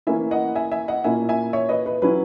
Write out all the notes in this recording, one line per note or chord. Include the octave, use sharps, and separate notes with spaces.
E3 A#3 C#4 E4 E5 G#5
D#5 F#5
E5 G#5
E5 G#5
D#5 F#5
A#2 A#3 C#4 E4 E5 G#5
E5 G#5
C#5 E5
B4 D#5
B4
F#3 C#4 E4 B4